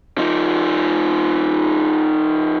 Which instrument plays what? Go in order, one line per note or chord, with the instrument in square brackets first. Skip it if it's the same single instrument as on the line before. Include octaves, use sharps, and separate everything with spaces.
[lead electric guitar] F3 D#4